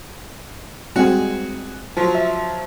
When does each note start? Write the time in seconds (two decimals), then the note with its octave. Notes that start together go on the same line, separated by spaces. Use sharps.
0.96 G3 G#3 C4 F#4 G#4
1.97 F3 F#3
2.15 E5